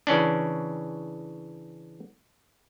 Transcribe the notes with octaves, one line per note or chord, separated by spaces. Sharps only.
C#3 E3 C#4 D4